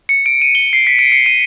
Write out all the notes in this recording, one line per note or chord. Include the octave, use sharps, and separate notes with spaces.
C#7
D7
D#7
G7
C7
B6
D7
C#7
D#7